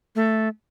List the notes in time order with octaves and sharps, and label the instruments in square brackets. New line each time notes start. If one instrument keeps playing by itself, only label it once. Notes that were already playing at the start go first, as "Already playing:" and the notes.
[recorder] A3